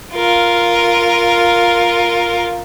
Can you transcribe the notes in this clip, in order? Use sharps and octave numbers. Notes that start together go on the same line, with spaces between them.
F4 A#4